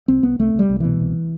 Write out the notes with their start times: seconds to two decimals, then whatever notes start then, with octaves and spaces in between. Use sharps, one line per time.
0.08 C2 C4
0.23 C2 B3
0.39 C2 A3
0.54 C2 G3
0.69 C2
0.80 B2 E3
1.00 C2